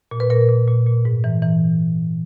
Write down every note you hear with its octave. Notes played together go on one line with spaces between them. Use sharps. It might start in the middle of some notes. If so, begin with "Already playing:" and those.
A#2
B4
A#2 A#4
A#2
A#2
A#2
G#2
E3
E3